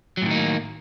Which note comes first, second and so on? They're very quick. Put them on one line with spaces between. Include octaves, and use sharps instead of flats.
F#3 A2 D#3 D#4 A#3